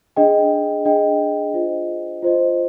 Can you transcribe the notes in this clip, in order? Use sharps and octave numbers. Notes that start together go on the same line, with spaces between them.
D4 G#4 D#5 G5
D4 G#4 D#5 G5
F4 C5 D#5
F4 C5 D#5